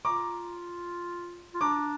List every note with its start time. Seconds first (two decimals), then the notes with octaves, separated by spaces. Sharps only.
0.05 F4 A#5 D6
1.54 F4
1.61 D4 A#5 D6